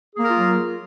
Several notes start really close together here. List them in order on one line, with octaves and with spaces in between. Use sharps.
G#4 A#3 A#4 F4 F#3